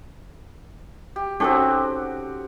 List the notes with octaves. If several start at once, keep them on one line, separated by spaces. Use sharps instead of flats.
G4
C4 C#4 D#4 F#4 G4 A4